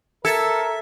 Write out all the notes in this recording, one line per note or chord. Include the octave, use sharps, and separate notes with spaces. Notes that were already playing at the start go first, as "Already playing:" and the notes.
A4 A#4 E5 E6 G#6 C#7